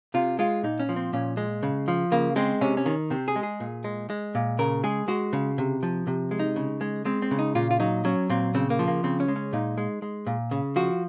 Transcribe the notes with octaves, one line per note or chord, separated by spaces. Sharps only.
C3 F4
G#3 F4
A#2 D#4
C#4
F3
C4
A#2 C#4
G#3
C#3
F3
C#3 A#3
G#3 C4
C3 C#4
C#4
D#3
C3 C4
G#4
G#3
G#4
A#2
G#3
G#3
A#2
C#3 A#4
G#3 G#4
G#3 F#4
C#3
C3
F3
C3
G#3
D#4
C#3
G#3
G#3 C4
C4
C#3
D#4
A#2 F4
F4
F#3 D#4
F#3 C#4
A#2 C4
C#3 C4
A#3
F3
A#3
C#3 C4
C#4
G#3
C#4
A#2 D#4
G#3
G#3
A#2
C#3
F3 F#4